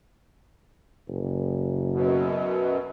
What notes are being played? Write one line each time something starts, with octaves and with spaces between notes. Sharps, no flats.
F#1
F#2 B2